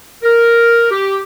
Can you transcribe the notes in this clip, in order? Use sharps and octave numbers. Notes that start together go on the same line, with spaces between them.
A#4
G4